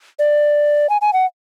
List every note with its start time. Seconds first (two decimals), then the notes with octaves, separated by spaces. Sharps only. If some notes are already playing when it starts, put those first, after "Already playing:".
0.19 D5
0.90 G#5
1.01 G#5
1.13 F#5